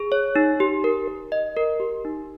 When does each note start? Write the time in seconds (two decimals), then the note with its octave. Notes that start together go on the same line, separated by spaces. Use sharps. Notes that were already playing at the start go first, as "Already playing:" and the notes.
Already playing: G#4
0.12 C#5
0.36 D#4
0.60 G4
0.84 A#4
1.08 A#4
1.32 D#5
1.57 A#4
1.80 G4
2.05 D#4